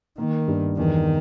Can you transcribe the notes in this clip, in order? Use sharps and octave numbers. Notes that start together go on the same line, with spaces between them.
D#3 A#3
G2
E2 D#3